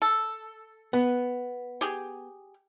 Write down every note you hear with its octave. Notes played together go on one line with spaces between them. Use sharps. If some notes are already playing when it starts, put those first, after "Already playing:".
A4
B3
G4 G#4